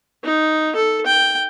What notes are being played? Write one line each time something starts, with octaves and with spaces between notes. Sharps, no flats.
D#4
A4
G5